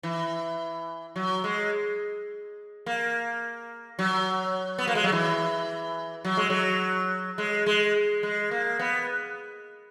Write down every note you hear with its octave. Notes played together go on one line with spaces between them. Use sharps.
E3
F#3
G#3
A#3
F#3
B3
A#3
G#3
F#3
E3
F#3
G#3
F#3
G#3
G#3
G#3
A#3
B3